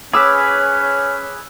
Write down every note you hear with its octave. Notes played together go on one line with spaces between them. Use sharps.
C#4 G#4 B4 C#5 D6 E6